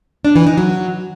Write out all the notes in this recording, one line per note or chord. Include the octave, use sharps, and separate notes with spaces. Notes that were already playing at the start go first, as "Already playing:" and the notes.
D4
E3
D#4
F#3